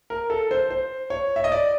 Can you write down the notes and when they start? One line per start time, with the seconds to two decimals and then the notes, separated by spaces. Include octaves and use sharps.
0.10 A#4
0.30 A4
0.51 C5
0.70 C5
1.10 C#5
1.36 E5
1.44 D#5
1.52 D5